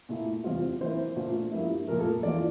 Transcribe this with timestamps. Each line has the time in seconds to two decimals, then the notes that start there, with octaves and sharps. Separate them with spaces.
0.09 A#2 A3 E4
0.44 E2 C3 G3 C4 F4
0.81 E3 A#3 E4 C5
1.16 A#2 A3 D4 F4
1.51 G2 F3 A#3 E4
1.87 A#2 F3 A3 A#4
2.00 A4
2.23 E2 E3 A#3 F4 D5